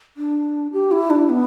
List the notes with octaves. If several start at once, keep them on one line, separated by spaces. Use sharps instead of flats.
D4
G4
E4
D4
B3